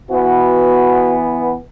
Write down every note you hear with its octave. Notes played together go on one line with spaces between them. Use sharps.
E3 B3 F#4